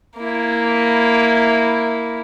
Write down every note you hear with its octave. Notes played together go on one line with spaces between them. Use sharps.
A#3 E4